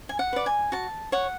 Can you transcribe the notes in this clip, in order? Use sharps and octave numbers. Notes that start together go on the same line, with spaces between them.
G#5
F#5
B4 D5
G#5
F#4 A5
C#5 F#5